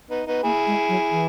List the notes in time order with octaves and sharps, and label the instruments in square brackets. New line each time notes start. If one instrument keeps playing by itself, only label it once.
[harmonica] B3 D#4
B3 D#4
[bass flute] A#3 [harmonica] E4 G#4
[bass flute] G#3
F#3
E3